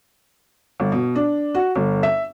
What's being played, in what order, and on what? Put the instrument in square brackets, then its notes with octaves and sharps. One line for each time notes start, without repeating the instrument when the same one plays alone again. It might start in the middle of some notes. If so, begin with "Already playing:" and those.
[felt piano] G1
B2
D4
F#4
G1
E5